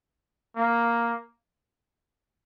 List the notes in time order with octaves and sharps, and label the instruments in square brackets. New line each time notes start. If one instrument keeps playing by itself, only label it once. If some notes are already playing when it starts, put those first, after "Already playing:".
[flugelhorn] A#3